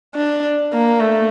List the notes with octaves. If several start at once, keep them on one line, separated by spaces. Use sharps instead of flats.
D4
A#3
A3